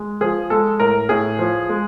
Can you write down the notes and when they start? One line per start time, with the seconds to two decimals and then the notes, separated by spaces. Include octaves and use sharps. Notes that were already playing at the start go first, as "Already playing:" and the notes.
Already playing: G#3
0.21 F3 G#4
0.50 G#3 A4
0.80 A2 A#4
1.09 A2 G#4
1.39 F3
1.69 G#3